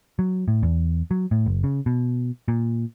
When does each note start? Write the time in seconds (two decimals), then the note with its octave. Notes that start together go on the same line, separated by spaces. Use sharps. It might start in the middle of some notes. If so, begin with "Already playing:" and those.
0.19 F#3
0.48 A2
0.63 E2
1.11 F#3
1.31 A2
1.46 F#1
1.64 C#3
1.86 B2
2.48 A#2